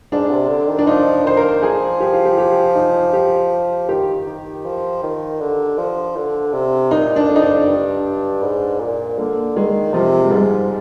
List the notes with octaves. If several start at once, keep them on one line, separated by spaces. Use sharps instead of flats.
G#2 D4
C3
D3
D#3
D4
F3 D#4
D#3 C5
A#4
F3 G#4
G4
F4
G4
G4
D#4
G4
D#3 G4
D#3
F3
D#3
D3
F3
D3
C3
A#2 D#4
D4
F2
D#4
D4
G2
G#2
A#2
D3 A#3
D#3 G#3
C3 F3
G#3
G#2 G3